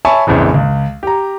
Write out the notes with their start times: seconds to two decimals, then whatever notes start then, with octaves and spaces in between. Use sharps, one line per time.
0.05 C#5 E5 G#5 A5 B5 C#6
0.27 A#1 F2 C#3 E3
0.54 C#2
1.03 G4 A#5